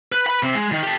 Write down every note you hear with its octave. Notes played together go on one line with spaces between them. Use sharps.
B4
B4 B5
C3 C4
G#3
D#3
G4 A4